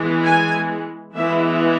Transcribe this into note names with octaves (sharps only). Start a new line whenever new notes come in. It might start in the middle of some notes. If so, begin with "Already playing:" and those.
Already playing: E3 G#3 B3
G#5
E3 G#3 B3 E4 E5